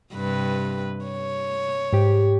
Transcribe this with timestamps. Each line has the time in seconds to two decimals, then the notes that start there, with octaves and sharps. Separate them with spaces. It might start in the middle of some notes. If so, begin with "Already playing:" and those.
0.13 G2 C3 B4
1.05 C#5
1.93 G#2 G4